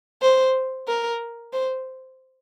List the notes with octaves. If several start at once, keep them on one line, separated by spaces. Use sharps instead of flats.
C5
A#4
C5